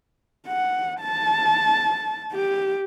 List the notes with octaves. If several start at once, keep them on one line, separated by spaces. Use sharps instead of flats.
F#5
A5
G4